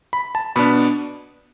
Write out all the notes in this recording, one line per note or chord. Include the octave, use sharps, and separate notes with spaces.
B5
A5
B2 B3 D4 B5